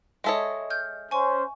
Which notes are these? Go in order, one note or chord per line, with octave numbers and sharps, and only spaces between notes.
G#3 A4 C#5 D#5 E5 D#6
F6 G6
C#4 C5 G#5 C#6